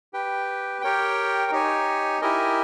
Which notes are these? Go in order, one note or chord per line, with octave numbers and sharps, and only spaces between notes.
G4 B4 G5
G4 A#4 C#5 G5
D#4 G4 C#5 G#5
E4 G4 A#4 D#5 G#5